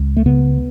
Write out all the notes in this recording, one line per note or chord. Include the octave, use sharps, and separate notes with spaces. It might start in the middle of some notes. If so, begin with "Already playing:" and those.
Already playing: C#2
A3
C#3 B3